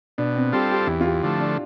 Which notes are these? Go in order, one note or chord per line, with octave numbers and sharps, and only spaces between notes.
B2 D4
C4
G3 C4 F4 G4 A4
G4
E2 E4
F4
G4
D3 F3 A3
D4